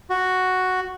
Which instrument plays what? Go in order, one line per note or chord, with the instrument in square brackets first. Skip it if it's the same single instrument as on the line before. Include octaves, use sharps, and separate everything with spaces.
[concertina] F#4